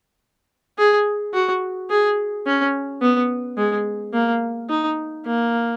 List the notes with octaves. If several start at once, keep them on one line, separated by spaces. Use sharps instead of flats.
G#4
F#4
G#4
C#4
B3
G#3
A#3
D#4
A#3